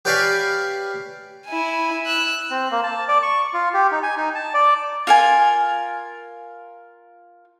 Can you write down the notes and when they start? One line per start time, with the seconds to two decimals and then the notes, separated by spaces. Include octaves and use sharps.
0.05 G4 B4 C#5 D5 F5 G#5
1.46 E4 G#5
2.07 E6 F#6
2.50 C4
2.71 A#3
2.84 A5
3.09 D5
3.23 C#6
3.54 F4
3.74 G4
3.91 D#4
4.03 G#5
4.17 D#4
4.35 A5
4.54 D5
5.07 F4 A#4 G#5